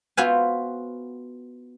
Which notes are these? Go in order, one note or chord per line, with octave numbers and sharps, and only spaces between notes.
B3 F4 F#4 C5 E5 G#5